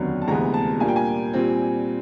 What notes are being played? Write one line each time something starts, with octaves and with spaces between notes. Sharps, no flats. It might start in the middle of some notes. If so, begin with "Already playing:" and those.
Already playing: F1 D#2 D3 F#3 B3
A5
D2 C3 E3 G#3 B3 A#5
A5
A#2 G3 A#3 D4 F4 G#5
G5
G#5
A#2 G3 C4